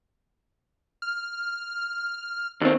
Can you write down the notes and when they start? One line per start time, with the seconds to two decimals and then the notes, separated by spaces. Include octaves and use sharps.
1.02 F6
2.61 D#2 C4